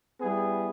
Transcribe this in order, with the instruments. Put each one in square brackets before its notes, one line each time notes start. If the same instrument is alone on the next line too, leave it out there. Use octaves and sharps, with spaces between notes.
[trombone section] G3 B3 E4 G#4